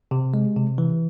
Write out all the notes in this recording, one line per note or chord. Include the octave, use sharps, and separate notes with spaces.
C3
G#3
C3
E3